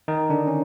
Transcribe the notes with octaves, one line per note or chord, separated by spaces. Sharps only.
D#3 D#4
D3 D4
C#4